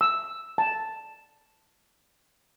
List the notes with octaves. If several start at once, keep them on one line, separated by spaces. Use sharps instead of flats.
E6
A5